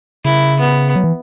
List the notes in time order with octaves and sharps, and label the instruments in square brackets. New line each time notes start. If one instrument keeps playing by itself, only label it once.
[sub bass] C#3 [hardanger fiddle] E4
[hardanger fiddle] B3
[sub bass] F#3
E3